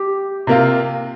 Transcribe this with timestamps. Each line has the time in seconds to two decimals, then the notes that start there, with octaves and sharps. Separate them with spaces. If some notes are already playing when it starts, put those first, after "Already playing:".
Already playing: G4
0.47 C3 A#3 F4